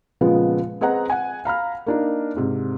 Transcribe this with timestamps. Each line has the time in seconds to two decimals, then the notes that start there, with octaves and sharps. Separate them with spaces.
0.21 A#2 C#3 F3 G#3 B3
0.81 C4 G#4 B4 D#5 F#5 A#5
1.10 F#5 G#5
1.45 F5 A#5 B5 F6
1.86 A#3 D4 D#4
2.36 G#2 C3